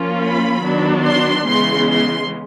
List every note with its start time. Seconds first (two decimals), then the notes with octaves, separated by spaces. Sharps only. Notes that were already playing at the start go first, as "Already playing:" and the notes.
Already playing: F3 A#3 C#4 F4
0.22 B5
0.63 D#3 F#3 B3 D4
1.05 C6
1.46 C#3 E3 G#3 B3 C6
1.89 C6